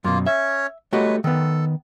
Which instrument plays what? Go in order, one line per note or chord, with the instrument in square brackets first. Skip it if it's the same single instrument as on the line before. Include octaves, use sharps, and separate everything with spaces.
[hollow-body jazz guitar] F#2 B2 [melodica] A#3 F4
[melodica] C#4 C#5 [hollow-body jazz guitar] E5
[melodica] F#3 G#3 B4 [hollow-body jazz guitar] A3 F#4 G4
[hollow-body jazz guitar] D#3 B3 [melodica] A4